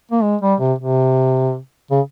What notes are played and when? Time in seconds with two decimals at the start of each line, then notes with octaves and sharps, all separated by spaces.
0.11 A#3
0.23 G#3
0.42 G3
0.60 C3
0.79 C3
1.91 C#3